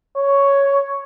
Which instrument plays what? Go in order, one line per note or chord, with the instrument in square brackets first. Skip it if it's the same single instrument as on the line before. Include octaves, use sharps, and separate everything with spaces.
[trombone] C#5